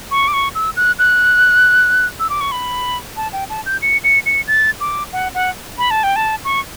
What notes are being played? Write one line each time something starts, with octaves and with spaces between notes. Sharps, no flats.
C#6
D6
C#6
E6
F#6
F#6
E6
D6
C#6
B5
A5
G5
A5
G6
C#7
C#7
C#7
A6
D6
F#5
F#5
B5
A5
G5
A5
C#6